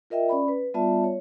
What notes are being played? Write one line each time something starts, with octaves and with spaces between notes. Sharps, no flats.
F4 A#4 D#5 E5 G5
C#4 D5 B5
B4
G3 B3 F4 D5 E5 A5
C#5